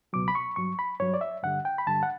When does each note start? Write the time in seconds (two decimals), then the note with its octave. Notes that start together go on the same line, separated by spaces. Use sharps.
0.13 C#2 B2 F#3 D6
0.28 B5
0.35 C#6
0.56 G2 F#3 C#6
0.79 B5
1.00 G2 F#3 C#5
1.14 D5
1.21 E5
1.43 G2 D3 G3 F#5
1.65 G5
1.78 B5
1.87 G2 D3 G3 A5
2.03 F#5